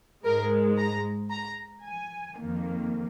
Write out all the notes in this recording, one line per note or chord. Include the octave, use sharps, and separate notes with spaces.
G#2 G#3 A#4
A#5
A#5
G#5
F2 D#3 A#3